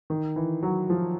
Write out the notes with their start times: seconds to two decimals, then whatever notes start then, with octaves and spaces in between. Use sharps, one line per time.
0.10 D#3
0.36 E3
0.62 F#3
0.90 F3